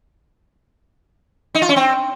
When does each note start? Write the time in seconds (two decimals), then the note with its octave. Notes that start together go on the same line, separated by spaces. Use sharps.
1.55 D#4
1.62 F4
1.69 C#4
1.76 C4